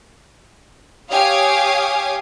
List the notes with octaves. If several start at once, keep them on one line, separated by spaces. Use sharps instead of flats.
G4 C#5 F5 G#5 D#6